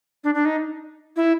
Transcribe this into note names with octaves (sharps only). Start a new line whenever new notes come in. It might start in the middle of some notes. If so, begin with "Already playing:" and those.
D4
D4
D#4
E4